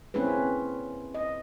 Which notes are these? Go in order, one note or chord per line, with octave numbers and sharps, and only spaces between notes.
A#3 C4 C#4 E4 G#4 B4
D#5